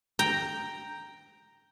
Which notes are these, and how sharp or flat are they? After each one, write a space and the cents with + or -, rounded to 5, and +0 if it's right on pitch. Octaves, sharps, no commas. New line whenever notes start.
G5 +0 A#5 +0